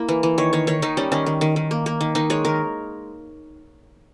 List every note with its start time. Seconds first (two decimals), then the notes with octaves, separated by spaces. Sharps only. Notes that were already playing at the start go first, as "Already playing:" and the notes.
Already playing: A#3 E4
0.09 E3
0.23 E3
0.38 D#3 C#5
0.53 D#3 C#5
0.67 D#3 C#5
0.82 D#3 D#4
0.97 G3 C#4
1.12 D#3 C#4
1.26 D#3
1.41 D#3
1.56 D#3
1.71 A#3
1.86 A#3
2.01 D#3
2.15 D#3 D#4
2.30 G#3 C#5
2.45 D#3 A#4